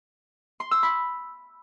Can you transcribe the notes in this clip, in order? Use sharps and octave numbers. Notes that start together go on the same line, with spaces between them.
C6
E6
B5